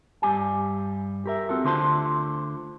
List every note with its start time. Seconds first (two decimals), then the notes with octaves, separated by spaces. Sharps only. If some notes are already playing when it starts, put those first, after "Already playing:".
0.22 G2 G3 G#3 G4 G#5
1.26 G4 A#4 E5
1.49 C4 F4 F#4 A4
1.64 D2 D3 F4 C5 A5 C6